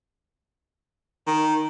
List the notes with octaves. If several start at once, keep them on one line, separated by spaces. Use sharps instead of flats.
D#3